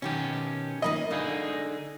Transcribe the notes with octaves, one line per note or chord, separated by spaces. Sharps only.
B2 D#3 C#4 G4 A5
D#3 A#3 D#4 D#5 B5
D3 D#4 G#4 F5